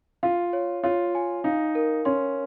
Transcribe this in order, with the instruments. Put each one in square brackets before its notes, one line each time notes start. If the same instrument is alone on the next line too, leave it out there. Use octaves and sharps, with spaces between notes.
[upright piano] F4 [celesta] F5
[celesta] C#5
[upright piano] F4 [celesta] C#5
[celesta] G#5
[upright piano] D#4 [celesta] F5
[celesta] A#4
[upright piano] C#4 [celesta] C6